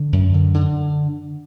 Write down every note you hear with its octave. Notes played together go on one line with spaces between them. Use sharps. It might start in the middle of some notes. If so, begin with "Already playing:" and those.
Already playing: D3
F#2
D3
D3